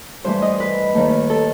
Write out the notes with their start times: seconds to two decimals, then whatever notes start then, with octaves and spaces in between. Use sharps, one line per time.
0.24 G2 E3 A3 C5
0.42 D#5
0.60 B4
0.95 D#2 D#3 A3
1.30 A4